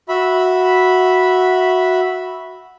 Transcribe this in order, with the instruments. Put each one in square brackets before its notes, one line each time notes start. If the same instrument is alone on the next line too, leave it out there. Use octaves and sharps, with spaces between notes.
[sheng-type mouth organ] F#4 E5 B5